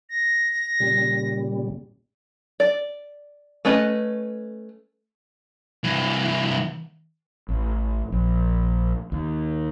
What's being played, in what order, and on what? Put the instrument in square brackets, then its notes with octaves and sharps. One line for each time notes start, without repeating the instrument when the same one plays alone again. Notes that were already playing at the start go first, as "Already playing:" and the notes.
[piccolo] A#6
[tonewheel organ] A#2 C#3 G3
[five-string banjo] D5
A3 C#4 B4 D#5
[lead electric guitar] C2 E3
[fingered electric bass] A1
A#1
D#2